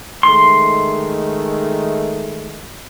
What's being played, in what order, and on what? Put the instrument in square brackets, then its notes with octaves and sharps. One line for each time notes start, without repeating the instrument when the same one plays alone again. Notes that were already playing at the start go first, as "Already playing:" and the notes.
[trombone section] D#3 G#3 A3 [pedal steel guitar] C6